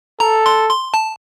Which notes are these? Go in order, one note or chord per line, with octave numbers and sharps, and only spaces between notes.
A4 A#5
C6
C6
A5